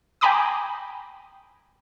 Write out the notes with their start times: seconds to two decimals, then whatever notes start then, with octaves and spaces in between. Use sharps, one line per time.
0.21 G5 G#5 A#5 B5 D6 D#6